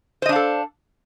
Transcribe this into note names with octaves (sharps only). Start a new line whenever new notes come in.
D4 A4 C5 D#5 F5